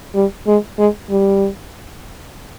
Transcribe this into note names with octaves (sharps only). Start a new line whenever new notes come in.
G3
G#3
G#3
G3